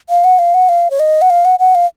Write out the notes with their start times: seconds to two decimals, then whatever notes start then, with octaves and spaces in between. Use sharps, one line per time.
0.09 F5
0.24 F#5
0.39 F5
0.54 F#5
0.69 F5
0.90 C#5
0.99 D#5
1.21 F#5
1.30 F5
1.45 F#5
1.59 F#5
1.75 F5